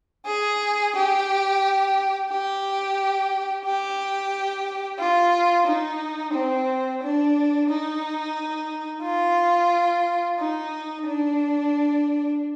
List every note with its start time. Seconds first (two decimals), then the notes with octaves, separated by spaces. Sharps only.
0.27 G#4
0.95 G4
2.30 G4
3.65 G4
4.99 F4
5.67 D#4
6.34 C4
7.02 D4
7.69 D#4
9.04 F4
10.39 D#4
11.07 D4